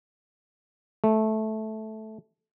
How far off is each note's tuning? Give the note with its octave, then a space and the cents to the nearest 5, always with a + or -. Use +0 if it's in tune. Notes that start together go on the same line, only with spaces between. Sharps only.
A3 -10